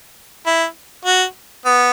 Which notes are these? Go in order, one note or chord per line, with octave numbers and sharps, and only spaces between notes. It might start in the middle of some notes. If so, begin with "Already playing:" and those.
E4
F#4
B3